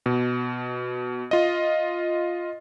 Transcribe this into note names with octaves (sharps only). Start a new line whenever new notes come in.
B2
F4 D#5